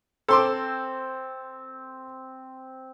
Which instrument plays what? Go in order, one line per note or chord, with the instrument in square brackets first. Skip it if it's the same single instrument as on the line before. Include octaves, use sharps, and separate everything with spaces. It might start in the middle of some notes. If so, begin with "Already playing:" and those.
[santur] C4 [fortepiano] A4 C6 D6